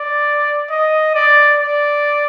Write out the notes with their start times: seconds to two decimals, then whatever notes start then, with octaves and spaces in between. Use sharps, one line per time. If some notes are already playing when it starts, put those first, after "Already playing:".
Already playing: D5
0.70 D#5
1.15 D5
1.61 D5